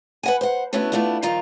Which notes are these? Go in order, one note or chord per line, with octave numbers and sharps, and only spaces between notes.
B4 F#5 G#5
C5 F#5
D3 A3 B3 C#4 E4 F#4
A3 B3 D4 E4 F4
F2 D#3 G3 F4 G5 A#5